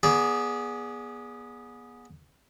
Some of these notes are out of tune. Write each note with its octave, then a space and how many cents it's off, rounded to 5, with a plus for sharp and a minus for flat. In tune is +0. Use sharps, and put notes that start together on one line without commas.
B3 -30 G#4 +0 D5 -15